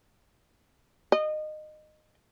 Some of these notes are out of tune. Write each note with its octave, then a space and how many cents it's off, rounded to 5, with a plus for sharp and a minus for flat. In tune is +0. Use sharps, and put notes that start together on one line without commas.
D#5 -20